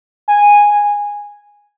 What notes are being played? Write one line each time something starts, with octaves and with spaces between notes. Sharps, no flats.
G#5